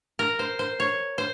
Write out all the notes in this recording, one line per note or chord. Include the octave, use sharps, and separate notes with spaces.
A#4
C5
C5
C#5
C5